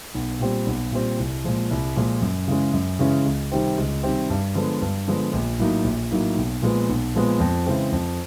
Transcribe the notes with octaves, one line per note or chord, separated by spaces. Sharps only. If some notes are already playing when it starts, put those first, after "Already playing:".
B1
A#2 G3 C4
B1
A#2 G3 C4
C2
A#2 F3 G#3
C2
A#2 F3 G#3
F#2
C#3 E3 G#3 C#4
F#2
C#3 E3 G#3 C#4
C#2
C3 D#3 G3 C4
C#2
C3 D#3 G3 C4
G2
D3 F3 G#3 B3
G2
D3 F3 G#3 B3
A#1
A2 F#3 A#3 D#4
A#1
A2 F#3 A#3 D#4
B1
A#2 F3 G#3 B3
B1
A#2 F3 G#3 B3
F2
C#3 E3 G#3 C4
F2